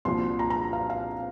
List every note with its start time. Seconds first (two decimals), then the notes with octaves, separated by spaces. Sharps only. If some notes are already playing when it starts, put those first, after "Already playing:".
0.05 C2 A#2 F3 C6
0.39 A#5
0.50 A#5
0.73 F5
0.90 F5